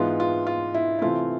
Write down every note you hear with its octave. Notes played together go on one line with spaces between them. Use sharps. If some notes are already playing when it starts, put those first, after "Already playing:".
Already playing: G#2 E3 B3 F4
F4
F4
E4
E4
C3 E3 A3 C4 F4